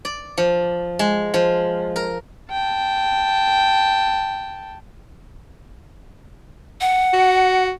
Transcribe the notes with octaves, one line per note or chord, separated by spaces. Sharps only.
D5
F3
G#3
F3
A#4
G5 A5
F#5
F#4